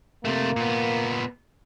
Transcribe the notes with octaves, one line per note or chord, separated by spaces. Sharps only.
C3 A3 A#3
A#2 B3